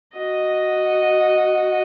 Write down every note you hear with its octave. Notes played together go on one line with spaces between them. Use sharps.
F#4 D#5